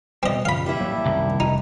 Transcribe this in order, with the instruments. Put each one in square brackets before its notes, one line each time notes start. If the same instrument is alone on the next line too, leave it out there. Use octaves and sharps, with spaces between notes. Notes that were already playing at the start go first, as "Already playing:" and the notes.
[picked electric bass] B2 G3 [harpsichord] C4 D#5
[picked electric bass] F#2 A#2 C#3 [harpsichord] F5 B5
[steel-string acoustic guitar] G3 D4 E4
[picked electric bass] A1 F#3 A#3
[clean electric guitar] C2 [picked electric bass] F#2 D#3
[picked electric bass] F1 [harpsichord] D#4